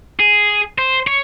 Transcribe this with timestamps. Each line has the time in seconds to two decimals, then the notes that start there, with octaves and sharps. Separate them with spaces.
0.20 G#4
0.78 C5
1.07 C#5